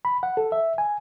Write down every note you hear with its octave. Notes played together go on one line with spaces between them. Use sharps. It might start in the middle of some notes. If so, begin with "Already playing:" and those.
B5
F#5
A4
E5
G#5